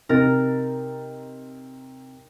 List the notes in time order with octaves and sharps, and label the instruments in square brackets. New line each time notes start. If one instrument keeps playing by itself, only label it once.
[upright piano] C3 D#4 A6 [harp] A#4